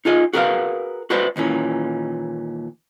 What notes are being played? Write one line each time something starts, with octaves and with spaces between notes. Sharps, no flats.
D#4 F4 G#4 D#5
F#4 G#4 A#4 B4 E5 F5
F#4 B4 C5 D5 E5
D#2 A#2 E3 C#4